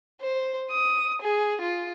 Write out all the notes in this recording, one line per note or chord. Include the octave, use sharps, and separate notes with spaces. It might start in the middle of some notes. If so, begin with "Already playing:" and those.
C5
D#6
G#4
F4